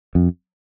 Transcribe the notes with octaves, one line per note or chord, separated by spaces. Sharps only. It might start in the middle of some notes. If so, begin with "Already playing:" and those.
F2